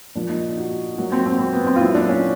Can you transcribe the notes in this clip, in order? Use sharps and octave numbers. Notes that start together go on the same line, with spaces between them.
A#2 F3 D4
D#4
F#4
A#2 F#3 F#4
C4
C4
C4
B3
C4
F4
A#2 F#3 E4
D4
C#4